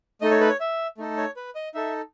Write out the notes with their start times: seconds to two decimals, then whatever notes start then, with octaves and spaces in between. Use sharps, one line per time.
0.21 A3 D#4 A4 D#5
0.31 C#5
0.40 B4
0.49 C#5
0.60 E5
0.98 A3 D#4 A4
1.17 C#5
1.37 B4
1.55 D#5
1.74 D#4 A4 E5